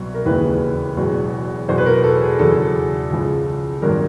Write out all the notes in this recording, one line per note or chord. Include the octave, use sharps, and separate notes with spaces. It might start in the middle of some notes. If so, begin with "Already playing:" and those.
Already playing: C2 B2 F#3
A#4
E1 D#2 C#3 E3 B4
E1 E2 B2 F#3
E2 B2 F#3 C5
B4
A#4
A4
G#4
E2 C#3 F#3 A4
C#2 C#3 F3
G#1 G2 D#3 F#3 A#4